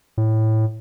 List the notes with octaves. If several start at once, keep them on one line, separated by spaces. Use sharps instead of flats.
A2